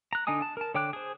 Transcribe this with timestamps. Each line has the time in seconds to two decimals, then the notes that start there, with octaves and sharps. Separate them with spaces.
0.13 A#5 F#6
0.27 D3 D4 D#4 G#5 D#6
0.42 A5
0.57 A#4 A5
0.74 D3 C#5 G5 D6 F#6
0.93 G#4 C5